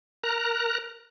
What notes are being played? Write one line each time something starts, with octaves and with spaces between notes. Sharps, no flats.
A#4 A#5 F#6